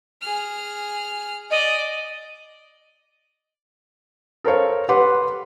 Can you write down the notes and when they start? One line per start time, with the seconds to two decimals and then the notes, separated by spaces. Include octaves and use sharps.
0.22 G#4 F6
1.51 D5 D#5
4.44 A4 A#4 C5 C#5 F5
4.89 G4 B4 F#5 C6 D6